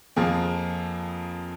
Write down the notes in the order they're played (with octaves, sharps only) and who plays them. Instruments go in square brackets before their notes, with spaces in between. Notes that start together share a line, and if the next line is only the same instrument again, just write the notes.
[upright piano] F2 F3 A#3 F4 G#4